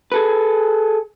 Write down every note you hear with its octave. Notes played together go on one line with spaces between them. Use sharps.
G#4 A4 B4